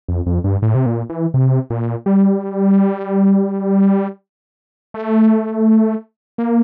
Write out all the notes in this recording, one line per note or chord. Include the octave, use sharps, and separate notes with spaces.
F2
F2
G2
A2
C3
A#2
E3
C3
A#2
G3
A3
A#3